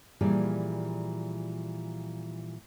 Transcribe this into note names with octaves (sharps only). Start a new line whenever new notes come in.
A#2 E3 F3 G3 G#4